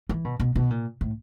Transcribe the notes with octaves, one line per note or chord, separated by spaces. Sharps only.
E3
B2
B2
B2
A#2
A2